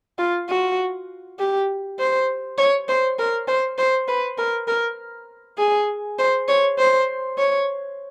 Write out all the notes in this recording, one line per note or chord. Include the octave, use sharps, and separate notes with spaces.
F4
F#4
G4
C5
C#5
C5
A#4
C5
C5
B4
A#4
A#4
G#4
C5
C#5
C5
C#5